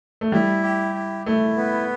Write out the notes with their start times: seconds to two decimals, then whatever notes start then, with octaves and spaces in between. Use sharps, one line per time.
0.21 A3
0.32 G3 E4
0.63 G4
0.95 E4
1.25 A3 E4
1.57 B3